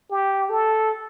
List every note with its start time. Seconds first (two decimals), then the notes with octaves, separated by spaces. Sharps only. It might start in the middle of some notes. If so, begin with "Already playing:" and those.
0.10 G4
0.50 A4